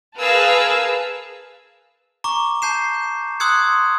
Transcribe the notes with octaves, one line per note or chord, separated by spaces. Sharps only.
G#4 A#4 B4 F5 A5 E6
A#5 C#6 D6
A5 G6 C7 E7
C6 D#6 E6 F#6 G#6 C#7